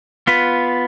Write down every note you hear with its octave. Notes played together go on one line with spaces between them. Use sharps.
B3 F4 B4